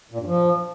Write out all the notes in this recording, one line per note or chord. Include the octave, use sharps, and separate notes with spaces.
A#2
G2
F3